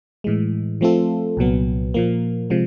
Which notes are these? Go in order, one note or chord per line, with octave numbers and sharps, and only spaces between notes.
A2 E3 G#3
F3 A3 C4 F4 A4
C2 A#2 F#3 B3
A#2 F3 A#3
C3 F3 G#3